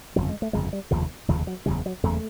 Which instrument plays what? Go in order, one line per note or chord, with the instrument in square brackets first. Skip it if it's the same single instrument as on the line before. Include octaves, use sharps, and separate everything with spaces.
[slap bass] G1 F2 C#3 F#3
G#3
A3
G1 F2 C#3 G#3
G3
F1 D#2 C#3 F3
F1 D#2 C#3 F3
F#3
F#1 E2 C#3 G3
F#3
F#1 E2 C#3 A3